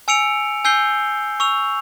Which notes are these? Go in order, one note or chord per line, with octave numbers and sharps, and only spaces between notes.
G#5 E6 C#7 D7 F7
G#5 E6 G6 C7 G7
C#6 E6 F7